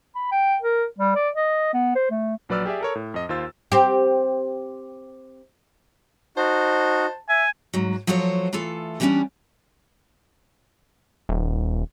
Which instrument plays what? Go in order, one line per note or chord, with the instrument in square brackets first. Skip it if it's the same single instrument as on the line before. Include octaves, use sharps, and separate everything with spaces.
[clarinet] B5
G5
A#4
G3
D5
D#5
B3
C5
A3
[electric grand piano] A#1 F#3 B4 D5 E6 F6
G4 G#4 D5 E5
A4 A#4 C#5
A2
F2 D#5
D#2 F4 C5 E6 A6
[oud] C4 G4
[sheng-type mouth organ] D#4 F#4 [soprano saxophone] C5 [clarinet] A5
[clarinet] E5 [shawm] G#5
[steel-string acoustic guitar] G#2 F#3
F3 F#3 A3 F#4 C5 C#5
E3 A3 F4 A4
D3 E3 G3 B3 C#4 D4
[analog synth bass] D#1